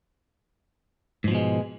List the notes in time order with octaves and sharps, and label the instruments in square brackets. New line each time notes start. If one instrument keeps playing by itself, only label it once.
[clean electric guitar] G#2
F3
B2
G#3